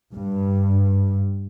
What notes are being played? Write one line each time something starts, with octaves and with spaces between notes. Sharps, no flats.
G2